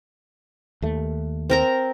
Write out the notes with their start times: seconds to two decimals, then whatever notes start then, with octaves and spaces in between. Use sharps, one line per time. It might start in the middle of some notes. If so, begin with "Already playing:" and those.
0.82 D#2 A3
1.50 C4 A#4 A#5